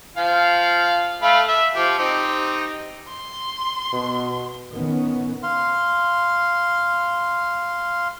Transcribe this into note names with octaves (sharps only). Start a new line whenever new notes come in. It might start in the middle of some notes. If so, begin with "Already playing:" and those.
F3 F5
A3 F5 B5
E5
F3 G4
C4 D#4 G4
C6
B2
D#3 B3 C#4
F5 C6